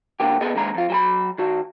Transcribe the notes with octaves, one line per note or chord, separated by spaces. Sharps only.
A2 D3 A3 A#3 G4
B3 G#4 A4 D#5
D#2 D3 G#3 A#5
F2 F4
F#3 G#4 B5
D#3 F#4